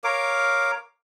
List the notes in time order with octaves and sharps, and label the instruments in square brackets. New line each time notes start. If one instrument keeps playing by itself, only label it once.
[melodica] A#4 C#5 F5 D6